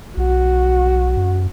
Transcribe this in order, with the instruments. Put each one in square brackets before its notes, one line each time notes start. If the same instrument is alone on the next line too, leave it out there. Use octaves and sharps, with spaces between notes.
[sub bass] B1 [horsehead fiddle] F#4
[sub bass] F#2